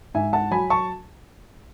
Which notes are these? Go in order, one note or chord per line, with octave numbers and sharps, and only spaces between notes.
G#2 E5 G#5
F#5 A5
F#3 G#5 B5
A5 C#6